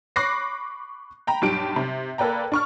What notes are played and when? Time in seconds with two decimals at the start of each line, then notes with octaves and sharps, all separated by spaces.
0.16 B5 C#6 D6 F#6 A#6 C7
1.27 G5 A#5 B5
1.42 B1 G2 G4 D7
1.76 C3
2.18 A#3 A4 B4 D5 G5 A#5
2.52 D4 C#6 F6